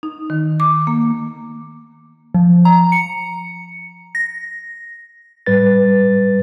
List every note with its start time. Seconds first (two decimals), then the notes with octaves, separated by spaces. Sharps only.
0.03 D#4
0.30 D#3
0.60 D6
0.87 A#3
2.34 F3
2.65 A#5
2.92 C#7
4.15 A#6
5.46 A2 G3 B4 A6